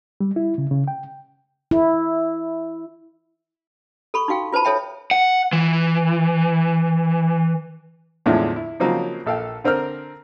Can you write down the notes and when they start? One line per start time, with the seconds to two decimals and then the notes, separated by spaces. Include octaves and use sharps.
0.20 G3
0.36 E4
0.58 C#3
0.71 C#3
0.88 G5
1.71 E4
4.14 A4 B5 C#6
4.28 D#4 F#4 F5 G5
4.52 F4 B4 C5 A5 B5
4.65 A4 C5 C#5 E5 G5 B5
5.11 F#5
5.53 E3
8.26 E2 A2 D3 F3 G#3 D4
8.56 E4
8.80 C#3 F3 F#3 A#3 C4 D#4
9.26 A#1 A4 F5 G5
9.64 D3 C4 A#4 C5 F6